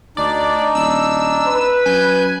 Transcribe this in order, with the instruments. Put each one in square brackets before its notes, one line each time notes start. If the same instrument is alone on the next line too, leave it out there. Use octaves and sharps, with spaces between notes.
[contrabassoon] D2 [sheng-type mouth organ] D4 D#4 [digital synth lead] D5
[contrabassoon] D#1 [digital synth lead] E6
[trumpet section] B4
[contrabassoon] F#2 [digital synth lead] G#5 [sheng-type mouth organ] G6